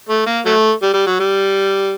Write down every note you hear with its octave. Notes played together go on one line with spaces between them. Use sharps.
A3
A#3
F#3 A3
G3
G3
F#3
G3